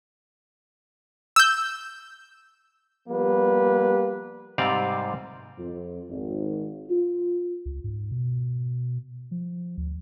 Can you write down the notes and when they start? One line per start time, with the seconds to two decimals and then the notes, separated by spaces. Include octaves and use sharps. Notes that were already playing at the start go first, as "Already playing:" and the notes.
1.36 E6 G6
3.09 F3 G3 A#3 B3 B4
4.58 G#2 C3 G3 C4 D5 F5
5.57 F2
6.10 G#1
6.88 F4
7.66 C#2
7.84 G#2
8.12 B2
9.31 F3
9.78 D2